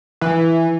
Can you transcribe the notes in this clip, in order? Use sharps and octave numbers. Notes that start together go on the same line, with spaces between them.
E3